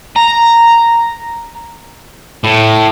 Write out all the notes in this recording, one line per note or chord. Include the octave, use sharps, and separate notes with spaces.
A#5
A2